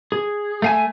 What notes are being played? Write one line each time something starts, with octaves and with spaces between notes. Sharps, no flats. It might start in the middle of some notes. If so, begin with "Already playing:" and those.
G#4
A3 F5 G#5